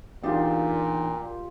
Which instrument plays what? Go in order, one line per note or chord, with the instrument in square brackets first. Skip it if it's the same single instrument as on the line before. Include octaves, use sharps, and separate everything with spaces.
[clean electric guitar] E2 D4 D#4 [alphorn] A#2 [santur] F4 G4